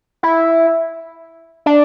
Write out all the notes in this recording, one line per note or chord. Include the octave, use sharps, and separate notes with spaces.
E4
D4